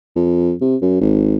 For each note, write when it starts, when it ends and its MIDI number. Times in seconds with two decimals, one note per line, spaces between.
0.16 0.53 41
0.61 0.76 48
0.82 0.98 42
1.01 1.37 32